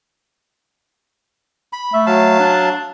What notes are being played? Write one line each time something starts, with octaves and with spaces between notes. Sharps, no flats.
B5
A3 E5
F#3 F5 A5
D4